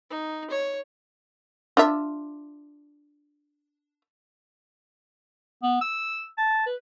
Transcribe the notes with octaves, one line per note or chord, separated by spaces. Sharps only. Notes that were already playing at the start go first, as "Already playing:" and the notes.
D#4
C#5
D4 F4 E5
B3
E6
A5
B4